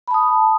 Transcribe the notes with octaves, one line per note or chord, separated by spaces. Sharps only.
A5 B5 D#6